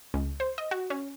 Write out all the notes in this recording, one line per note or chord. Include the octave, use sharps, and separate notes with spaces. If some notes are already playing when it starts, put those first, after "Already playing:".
C#2
C5
D#5
F#4
C#4